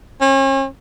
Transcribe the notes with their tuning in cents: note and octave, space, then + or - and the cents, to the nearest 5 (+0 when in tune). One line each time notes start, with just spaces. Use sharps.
C#4 -40